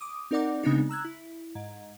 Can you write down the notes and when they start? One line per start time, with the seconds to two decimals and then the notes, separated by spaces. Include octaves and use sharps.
0.01 D6 D#6
0.31 C4 D#4 A#4 D5 F#5 D6
0.63 C#3 G#3 B3 C4 D4 D#4
0.89 A#5 E6 F#6 G#6
1.05 E4
1.55 G#2